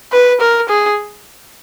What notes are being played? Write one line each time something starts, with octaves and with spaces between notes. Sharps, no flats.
B4
A#4
G#4